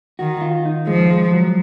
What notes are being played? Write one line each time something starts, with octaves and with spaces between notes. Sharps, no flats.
D#3 F#4
F4
D#4
F3 G#3
G#3
F#3